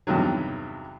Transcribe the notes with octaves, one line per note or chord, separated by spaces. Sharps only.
E2 G2 C3 D#3 F#3